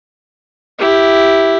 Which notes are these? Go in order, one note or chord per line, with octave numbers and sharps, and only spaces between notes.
E4 G4